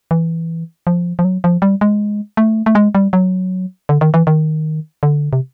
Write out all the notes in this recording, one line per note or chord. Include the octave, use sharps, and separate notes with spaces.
E3
F3
F3
F#3
F3
G3
G#3
A3
A3
G#3
G3
F#3
D3
D#3
E3
D#3
D3
C3